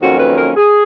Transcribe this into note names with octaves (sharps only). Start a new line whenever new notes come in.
F2 D#3 F#3 A#3 C#4 F#4
B4
A#4
G#4